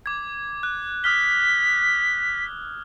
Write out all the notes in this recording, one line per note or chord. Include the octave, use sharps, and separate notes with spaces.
D6 G#6
F#6
D#6 F6 B6 G7